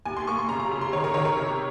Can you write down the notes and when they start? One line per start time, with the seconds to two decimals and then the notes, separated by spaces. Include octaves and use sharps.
0.05 D#2 G#5
0.17 C6
0.27 A#3 C#6
0.38 C6
0.49 C#3 A#5
0.60 A#5
0.71 C#3
0.81 C6
0.92 D#3 C#5
1.04 A#4
1.14 D#3 C#5
1.25 A#4
1.37 C3